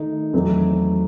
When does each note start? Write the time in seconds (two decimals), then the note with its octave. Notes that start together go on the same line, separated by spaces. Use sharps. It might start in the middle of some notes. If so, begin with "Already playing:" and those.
Already playing: D#3 A3 D#4
0.33 E2 D#3 F#3 A3 C4